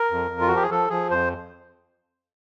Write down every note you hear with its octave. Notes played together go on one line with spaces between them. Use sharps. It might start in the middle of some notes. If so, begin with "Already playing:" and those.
Already playing: A#4
F2
F2
F4
F3 F#4
G4
G#4
F3 A4
F3 G#4
F2 C5